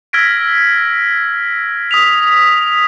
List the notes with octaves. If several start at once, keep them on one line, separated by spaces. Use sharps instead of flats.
E6 F6 G#6 A#6 B6 D7
D#6 B6 F7